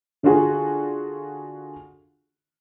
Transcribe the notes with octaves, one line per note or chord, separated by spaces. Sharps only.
D3 D4 F4 F#4 G#4